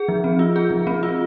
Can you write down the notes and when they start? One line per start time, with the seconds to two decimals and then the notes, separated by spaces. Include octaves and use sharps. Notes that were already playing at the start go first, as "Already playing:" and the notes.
Already playing: G#4
0.08 F3
0.24 C4
0.39 F4
0.56 G#4
0.71 F3
0.87 C4
1.03 F4